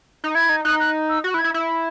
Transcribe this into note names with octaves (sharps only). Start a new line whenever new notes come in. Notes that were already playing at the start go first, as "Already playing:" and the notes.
D#4
E4 G#6
D#4
D#4 F#6
F#6
E6
F#4
F#6
E4
G#6
E4
E4